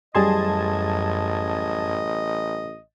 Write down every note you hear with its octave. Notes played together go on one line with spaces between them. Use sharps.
A1 F#2 G3 G#4 D#5 A5 C6 G#6